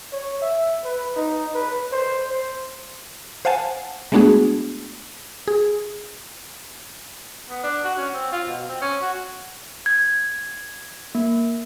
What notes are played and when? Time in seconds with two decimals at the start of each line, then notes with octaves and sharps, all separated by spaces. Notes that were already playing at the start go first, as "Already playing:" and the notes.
0.13 C#5
0.42 E5
0.84 B4
1.16 D#4
1.54 B4
1.92 C5
2.30 C5
3.45 C5 F5 F#5 G#5 A5
4.12 G#3 A3 B3 D4 F#4 G#4
5.48 G#4
7.50 B3
7.64 D4
7.85 F#4
7.98 C#4
8.14 C4
8.33 F4
8.48 B2
8.69 C4
8.82 C#4
9.02 F#4
9.86 G#6
11.15 A#3